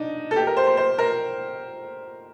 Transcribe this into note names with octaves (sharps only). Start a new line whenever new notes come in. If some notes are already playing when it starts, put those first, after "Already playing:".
Already playing: D4 D#4
A4
G4
A#4
C5
C5
C5
A#4